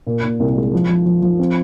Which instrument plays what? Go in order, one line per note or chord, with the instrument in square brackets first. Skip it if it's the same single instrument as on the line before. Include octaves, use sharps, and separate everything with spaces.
[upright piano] A#2
A#2
C2
G#3
F3
F3
F3
F3
C4